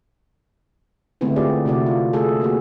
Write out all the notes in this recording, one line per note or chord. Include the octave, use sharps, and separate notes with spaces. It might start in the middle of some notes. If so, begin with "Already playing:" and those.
D3 G#3 A3 B3 C4 E4
F4 G4 G#4 D5
C3 A3 E4 F#4 D5
F4
A3 G#4 A4
A#3 F#4 G#4